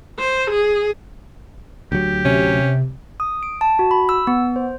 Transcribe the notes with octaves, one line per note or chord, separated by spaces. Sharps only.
C5
G#4
D2 F#3 G4
C3 C#4
D#6
D7
A5
F#4
B5
E6
B3
C5